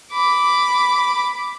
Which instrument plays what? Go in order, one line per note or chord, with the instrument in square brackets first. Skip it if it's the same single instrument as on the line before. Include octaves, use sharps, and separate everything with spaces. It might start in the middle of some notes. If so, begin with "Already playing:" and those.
[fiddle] B5 D6